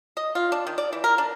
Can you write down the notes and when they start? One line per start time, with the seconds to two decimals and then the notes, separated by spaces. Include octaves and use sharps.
0.17 D#5
0.35 F4
0.52 D4
0.67 D#3
0.78 D5
0.93 E3
1.04 A#4
1.18 D4